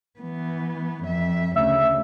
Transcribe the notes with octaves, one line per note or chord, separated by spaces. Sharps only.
E3 B3
F2 E5
D2 C#3 E5